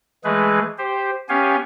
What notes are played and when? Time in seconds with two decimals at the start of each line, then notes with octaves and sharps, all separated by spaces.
0.24 E3 G#3 A3 G#4 B4
0.78 G4 C5
1.29 B3 C#4 G4 C#5 F5 G#5